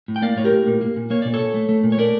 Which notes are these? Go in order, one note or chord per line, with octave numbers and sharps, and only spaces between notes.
A2
G5
A#3 D5 F5
A2 C#5
G4 A#4
A2
A#2
A#3
A#2
A#3 C#5
A#2 D5
A4 C#5
A#2
A3
A3
A#2
C#5
A3 A#4 D5